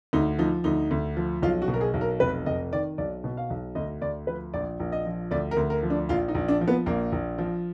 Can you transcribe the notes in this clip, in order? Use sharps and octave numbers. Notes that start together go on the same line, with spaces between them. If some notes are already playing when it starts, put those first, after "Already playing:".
D2 D#4
F3 D#4
D2 D#4
D2
F3
B1 F4
F#4
B2
A#4
G#4
B1
A#4
F1 B4
F1 D#5
D#3 D5
B1 D5
B2
F5
B1
D2 D#5
D2 D5
F3 B4
A#1 D5
A#1
D#5
F3
D2 D5
A#4
D2
A#4
F3
D4
A#1 F4
D#4
A#1
D4
F3
B3
A#1 A#3
A#1
F3